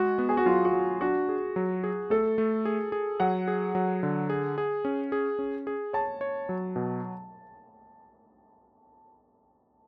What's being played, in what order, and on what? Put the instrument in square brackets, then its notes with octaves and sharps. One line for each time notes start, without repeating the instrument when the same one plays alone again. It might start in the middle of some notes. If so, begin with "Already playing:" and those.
Already playing: [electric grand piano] G#3 [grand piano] F#4
[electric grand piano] B3
[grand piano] G#4
F#4
[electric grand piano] F#3 [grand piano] F4
[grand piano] F#4
[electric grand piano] F#3
[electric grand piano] D4 [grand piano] F#4
[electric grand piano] G#4
F#3
G#4
[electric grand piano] A3 [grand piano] A4
[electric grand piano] A3
G#4
G#4
[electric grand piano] F#3 [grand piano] F#5
[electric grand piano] G#4
F#3
D3
G#4
G#4
C#4
G#4
C#4
G#4
[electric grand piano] C#5 [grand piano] A5
[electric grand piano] C#5
F#3
B2